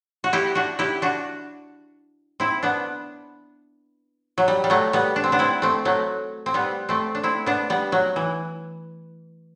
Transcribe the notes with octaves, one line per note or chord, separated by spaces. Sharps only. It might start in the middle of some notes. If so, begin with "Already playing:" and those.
F#4
E4 G4
D4 F#4
E4 G4
D4 F#4
C4 E4
B3 D4
F#3
G3
G3
F#3 A3
G3 B3
D4
C4
B3 D4
C4 E4
A3 C4
F#3 A3
C4
G3 B3
A3 C4
D4
C4 E4
B3 D4
G3 B3
F#3
E3